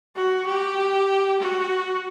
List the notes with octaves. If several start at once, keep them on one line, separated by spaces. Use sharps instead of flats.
F#4
G4
F#4